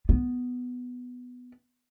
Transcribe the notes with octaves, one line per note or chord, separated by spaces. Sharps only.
B3